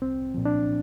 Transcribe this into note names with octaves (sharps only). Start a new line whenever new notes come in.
C2 C4
A#2 F3
D4